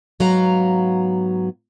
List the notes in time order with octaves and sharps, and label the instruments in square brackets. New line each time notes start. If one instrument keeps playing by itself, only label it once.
[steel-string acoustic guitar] G#2 F#3 B3 F5 A#5